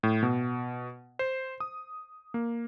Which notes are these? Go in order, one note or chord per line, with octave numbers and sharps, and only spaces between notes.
A2
B2
C5
D#6
A#3